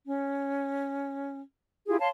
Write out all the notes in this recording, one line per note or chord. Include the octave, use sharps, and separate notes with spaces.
C#4
E4 F4 G4 G#4
C#5 F5 A5 C6